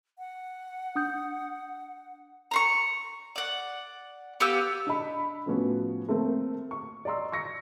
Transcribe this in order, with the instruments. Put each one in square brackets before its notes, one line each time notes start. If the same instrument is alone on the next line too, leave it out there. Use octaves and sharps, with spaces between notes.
[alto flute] F#5
[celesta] D4 D#6 G6
[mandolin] A#5 C6 C#6
D5 F#5
B3 G4 F5 E6
[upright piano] D4 D#5 B5
A2 F3 B3 C#4 F#4
A3 A#3 C4 A#4
C#6
D5 D#5 A#5 C6 E6
C#6 E6 A#6 C#7